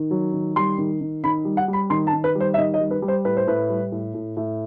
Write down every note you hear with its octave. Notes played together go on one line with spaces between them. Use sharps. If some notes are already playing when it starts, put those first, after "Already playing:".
Already playing: D#3
F#3
D#3
G3 C6
D#3
D#3
D#3 B5
G3
F#5
G3
B5
D#3 C6
A5
D#3
B4
G3
C5
E5
D#3 D#5
D#5
G3
B4
G3
C5
A2 B4
C5
A2 B4
G3
A2
A2
A2